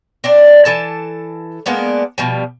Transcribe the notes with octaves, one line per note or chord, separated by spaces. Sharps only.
C4 D4 D5
E3 A4 A5
G#3 A#3 B3 D4
B2 F3 G3